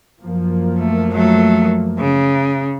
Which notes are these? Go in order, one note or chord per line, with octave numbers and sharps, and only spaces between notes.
F#2 F3 A#3
A3
F#3 A3
C#3